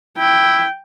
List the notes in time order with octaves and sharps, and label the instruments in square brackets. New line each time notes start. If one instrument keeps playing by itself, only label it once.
[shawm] E4 [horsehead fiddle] G5